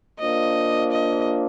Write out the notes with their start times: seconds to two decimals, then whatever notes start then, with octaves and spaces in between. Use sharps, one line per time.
0.19 A#3 D4 F4 C5 D#5
0.92 D#5